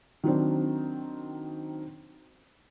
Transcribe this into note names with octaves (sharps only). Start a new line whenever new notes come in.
D#3 F#3 C4 D4